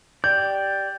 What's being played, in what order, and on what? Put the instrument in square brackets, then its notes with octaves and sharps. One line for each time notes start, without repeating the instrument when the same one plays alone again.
[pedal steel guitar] G4 D5 [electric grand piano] G6